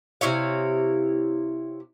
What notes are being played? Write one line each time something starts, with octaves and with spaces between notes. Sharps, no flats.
C3 E4 C#5 F5